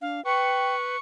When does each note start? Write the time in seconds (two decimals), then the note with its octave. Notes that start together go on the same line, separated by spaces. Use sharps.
0.02 D4 F5
0.25 B4 G5 C#6